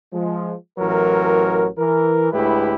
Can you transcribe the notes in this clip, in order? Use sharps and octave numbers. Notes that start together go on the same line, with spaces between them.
F3 G#3
A1 E3 F#3 A#4
E3 A#4
D2 A2 G#3 E4 G4 B4